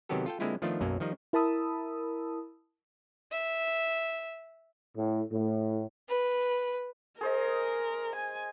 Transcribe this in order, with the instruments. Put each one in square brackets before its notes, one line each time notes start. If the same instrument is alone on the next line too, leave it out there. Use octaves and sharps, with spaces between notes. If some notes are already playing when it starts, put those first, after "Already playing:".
[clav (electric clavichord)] C3 D#3 F#3 B3 G4 A4
F4 A4 G5
D3 G#3 A#3 C4 E4 F4
D#3 F3 A3 B3 D4 F4
B1 F#2 F#3 A#3
D#3 F3 G3 D#4
[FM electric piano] E4 A#4 A5 B5 D#6 E6
[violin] E5
[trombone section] A2
A2
[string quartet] B4
[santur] G#4 C5 D#5 [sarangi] A#4
[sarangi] G#5